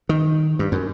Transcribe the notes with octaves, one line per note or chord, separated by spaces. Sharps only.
D#3
G2
F#2